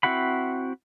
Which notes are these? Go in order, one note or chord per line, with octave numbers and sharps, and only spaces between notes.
C4 E4 F#4 F#5 B5